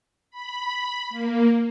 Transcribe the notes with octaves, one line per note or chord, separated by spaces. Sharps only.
B5
A#3